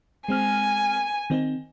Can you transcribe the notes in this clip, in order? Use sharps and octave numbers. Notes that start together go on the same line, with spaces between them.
G#3 C4 G#5 F6
D#3 C4 D#4